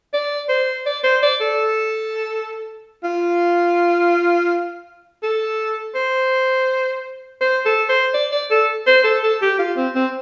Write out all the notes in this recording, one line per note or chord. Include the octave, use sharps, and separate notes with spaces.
D5
C5
D5
C5
D5
A4
F4
A4
C5
C5
A4
C5
D5
D5
A4
C5
A4
A4
G4
F4
C4
C4